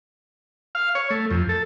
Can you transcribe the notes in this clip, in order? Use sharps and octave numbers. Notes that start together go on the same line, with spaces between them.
F5
C#5
A3
F2
A4